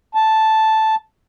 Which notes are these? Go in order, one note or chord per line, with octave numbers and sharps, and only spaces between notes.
A5